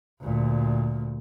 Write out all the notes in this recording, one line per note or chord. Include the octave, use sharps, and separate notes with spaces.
D2 A#2